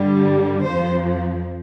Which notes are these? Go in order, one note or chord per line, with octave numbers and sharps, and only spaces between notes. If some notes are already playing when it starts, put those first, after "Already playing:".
Already playing: G2 D3 G3
F2 F3 C5